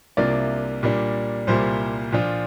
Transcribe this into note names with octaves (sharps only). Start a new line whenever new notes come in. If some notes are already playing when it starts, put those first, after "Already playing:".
C2 C3 A#3 D4 F4 D5
A#2 G3 A#3 D4
C2 A#2 G3 A#3 C5
A#2 F3 D4 F4